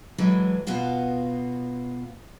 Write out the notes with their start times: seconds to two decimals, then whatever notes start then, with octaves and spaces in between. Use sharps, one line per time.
0.18 A2 E3 F#3 G#3
0.67 B2 B3 F4 F#4